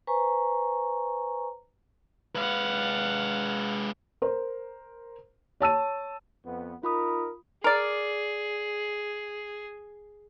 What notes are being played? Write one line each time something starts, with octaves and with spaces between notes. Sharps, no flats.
B4 C5 G#5 A#5 C#6
G#3 B4 F5 F#5
A#4 C5
C#5 A5 E6 D#7
F2 B3
D#4 F4 A#4 B5 D#6
G#4 A#4 D5